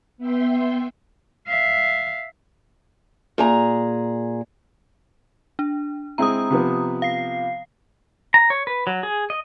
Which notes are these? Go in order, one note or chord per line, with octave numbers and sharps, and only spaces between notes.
B3 E5 G5 C6
E5 F5
A#2 G#4 A#5
D4
G#3 C4 E4 A#5 D#6
C3 F3 B3
F5 C7
A#5
C#5
B4
F#3
G#4
D#5